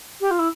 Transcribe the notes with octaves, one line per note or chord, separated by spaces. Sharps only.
G4
F4
E4